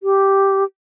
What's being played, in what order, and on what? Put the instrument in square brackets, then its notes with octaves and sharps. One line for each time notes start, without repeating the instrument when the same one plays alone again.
[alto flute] G4